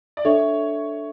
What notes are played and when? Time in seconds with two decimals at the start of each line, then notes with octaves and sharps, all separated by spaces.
0.17 D5
0.25 D4 A4 C#5 E5